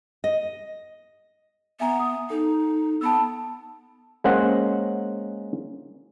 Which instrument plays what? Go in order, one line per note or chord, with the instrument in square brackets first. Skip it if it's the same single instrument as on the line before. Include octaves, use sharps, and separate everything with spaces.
[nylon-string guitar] D#5
[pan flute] B3 [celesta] E5 G#5 A#5
[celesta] D#6
[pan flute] D#4 [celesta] A4
[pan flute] B3 [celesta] A5 B5 E6
[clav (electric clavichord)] G#3 A#3 C#4 C5 F#5